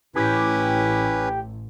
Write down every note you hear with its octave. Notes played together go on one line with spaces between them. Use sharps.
A1 C#4 E4 G4 B4